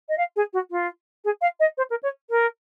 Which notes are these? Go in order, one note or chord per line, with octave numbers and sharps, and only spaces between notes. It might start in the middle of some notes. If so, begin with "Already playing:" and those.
D#5
F5
G#4
F#4
F4
G#4
F5
D#5
C5
A#4
C#5
A#4